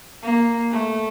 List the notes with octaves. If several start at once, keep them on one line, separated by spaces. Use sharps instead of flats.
A#3
A3